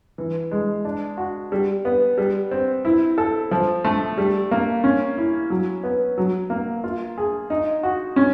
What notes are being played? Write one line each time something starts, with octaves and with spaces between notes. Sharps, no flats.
E3
G#3
D4
F#4
G3
B3
G3
C4
E4
A4
F3
A3
G3
A#3
C#4
E4
F#3
B3
F#3
A#3
F4
G#4
D#4
F#4
C#4